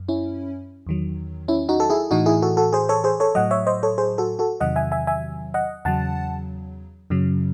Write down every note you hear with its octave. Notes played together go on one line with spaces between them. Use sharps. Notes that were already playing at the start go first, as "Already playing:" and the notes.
Already playing: F#2
C#4 E4
E2 D#3 F#3
C#4 E4
D#4 F#4
A4
E4 G#4
A2 E3 D#4 F#4
E4 G#4
F#4 A4
F#4 A4
G#4 C5
A4 C#5
G#4 C5
A4 C#5
A2 F#3 D#5 F#5
C#5 E5
C5 D#5
A4 C#5
G#4 C5
F#4 A4
F#4 A4
E2 C3 D#3 F#3 D#5 F#5
E5 G#5
E5 G#5
E5 G#5
D#5 F#5
E2 C#3 F#3 F#5 A5
F#2 C#3 F#3